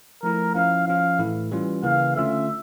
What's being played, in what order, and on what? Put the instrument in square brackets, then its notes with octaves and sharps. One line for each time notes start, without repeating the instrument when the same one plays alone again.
[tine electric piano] F3 A3 E4 [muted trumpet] A#4
[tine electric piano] F3 C#4 E4 [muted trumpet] F5
[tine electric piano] F3 C#4 F4 [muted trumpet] F5
[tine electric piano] A2 E3 A3 E4
E3 G3 C#4 F4
[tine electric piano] C#3 E3 A#3 [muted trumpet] F5
[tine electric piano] D3 A3 C#4 F4 [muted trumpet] E5